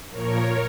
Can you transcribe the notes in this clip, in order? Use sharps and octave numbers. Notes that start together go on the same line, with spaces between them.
A#2 F3 A#4 C#5